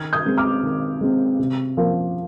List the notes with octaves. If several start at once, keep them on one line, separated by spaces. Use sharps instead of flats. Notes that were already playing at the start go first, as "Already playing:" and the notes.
Already playing: D#3 F6 G#6
D#6 G6
G#3 C4
D6 F6
D#3
G#3 C4
C3
F3 A#3